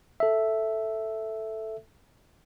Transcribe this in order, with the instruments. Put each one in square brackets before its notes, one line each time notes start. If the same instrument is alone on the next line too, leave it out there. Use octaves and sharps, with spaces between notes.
[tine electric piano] A4 E5